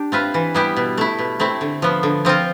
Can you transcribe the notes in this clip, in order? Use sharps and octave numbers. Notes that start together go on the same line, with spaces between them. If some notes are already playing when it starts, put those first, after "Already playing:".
Already playing: D4 G4
C4 F4 B4 E5
E3
G3 B3 E4 G4
B2
A3 E4
B2
A3 C4 E4
D3
F3 B3
D3
F3 C4 F4